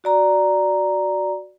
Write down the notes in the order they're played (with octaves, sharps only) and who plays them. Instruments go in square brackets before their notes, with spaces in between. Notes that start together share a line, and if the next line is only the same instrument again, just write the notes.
[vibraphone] F#4 D5 A#5